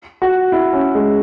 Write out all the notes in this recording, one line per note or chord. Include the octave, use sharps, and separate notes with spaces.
F#4
E4
C#4
G#3